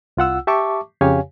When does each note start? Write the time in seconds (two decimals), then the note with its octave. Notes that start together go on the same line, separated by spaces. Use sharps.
0.17 C2 F4 F#5 E6
0.47 G4 E5 A5 C#6 D6
1.01 F2 C#3 G4 C#5 F5 G#5